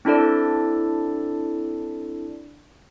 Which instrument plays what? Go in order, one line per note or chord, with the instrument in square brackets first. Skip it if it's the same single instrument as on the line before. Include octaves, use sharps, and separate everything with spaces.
[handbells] C4 D4 E4 A4 D5